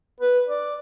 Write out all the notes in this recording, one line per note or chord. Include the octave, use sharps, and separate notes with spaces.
B4
D5